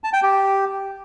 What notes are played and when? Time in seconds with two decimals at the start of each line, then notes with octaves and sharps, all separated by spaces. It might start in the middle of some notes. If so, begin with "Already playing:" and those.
0.04 A5
0.13 G5
0.23 G4